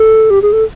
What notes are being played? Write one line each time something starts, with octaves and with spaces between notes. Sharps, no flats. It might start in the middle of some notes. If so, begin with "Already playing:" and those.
Already playing: A4
G4
G#4
A4